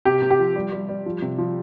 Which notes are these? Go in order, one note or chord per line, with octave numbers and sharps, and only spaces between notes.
C3 G4
C3
G4
F3
G3
G3
G3
F3
C3
F3